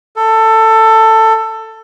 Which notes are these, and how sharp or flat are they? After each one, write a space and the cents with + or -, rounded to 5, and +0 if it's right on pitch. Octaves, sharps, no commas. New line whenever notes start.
A4 +15